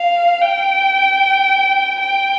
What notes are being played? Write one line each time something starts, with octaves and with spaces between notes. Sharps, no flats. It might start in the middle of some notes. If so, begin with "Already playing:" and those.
Already playing: F5
G5
G5